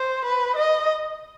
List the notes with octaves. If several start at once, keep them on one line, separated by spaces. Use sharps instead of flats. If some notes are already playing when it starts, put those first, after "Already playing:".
Already playing: C5
B4
D#5